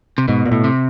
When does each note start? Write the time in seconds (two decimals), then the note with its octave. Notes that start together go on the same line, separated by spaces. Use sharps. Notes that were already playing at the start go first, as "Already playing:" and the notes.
0.18 C3
0.28 G#2 B2
0.45 A#2
0.51 A2
0.64 C3